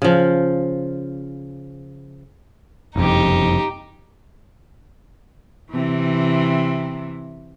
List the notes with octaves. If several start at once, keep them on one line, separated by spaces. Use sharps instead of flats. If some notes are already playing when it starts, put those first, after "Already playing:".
C#3 F3
F#1 C2 F2 D#4 G4
C3 E3